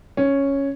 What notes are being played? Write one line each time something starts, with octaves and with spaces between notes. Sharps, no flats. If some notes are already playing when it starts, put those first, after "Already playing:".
C#4